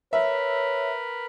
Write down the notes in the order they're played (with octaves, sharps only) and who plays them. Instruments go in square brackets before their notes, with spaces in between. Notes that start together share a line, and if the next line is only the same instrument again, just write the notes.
[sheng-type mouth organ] A#4 B4 [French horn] C#5 [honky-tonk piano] E5